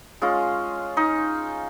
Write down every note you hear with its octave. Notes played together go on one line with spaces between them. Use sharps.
G#3 C#4 F4
D#4